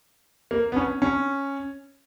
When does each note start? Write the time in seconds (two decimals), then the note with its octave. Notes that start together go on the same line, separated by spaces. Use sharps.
0.51 A#3
0.72 B3
0.77 C#4
1.02 C#4